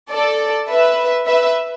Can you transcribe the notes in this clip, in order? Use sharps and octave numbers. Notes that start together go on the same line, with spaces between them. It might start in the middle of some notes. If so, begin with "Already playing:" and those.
A4 D5
B4 E5
B4 E5